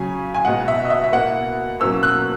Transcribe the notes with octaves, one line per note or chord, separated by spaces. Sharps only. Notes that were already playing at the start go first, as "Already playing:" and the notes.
Already playing: C#3 F#3 C#4 G#5
G#5
B2 G#3 D#4 F#5
E5
D#5
E5
E5
B2 A#3 E4 F#5
B2 F#3 A#3 C#4 E6
F#6